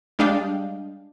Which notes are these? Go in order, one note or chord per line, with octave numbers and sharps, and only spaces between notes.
G3 G#3 D4 D#5 F5 G5